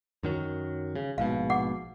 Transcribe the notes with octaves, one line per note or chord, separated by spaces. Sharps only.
F#2 D#3 F#3
C#3
A#1 G#2 B2 F5
F#5 D6